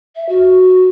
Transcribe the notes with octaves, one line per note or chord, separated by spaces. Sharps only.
E5
F#4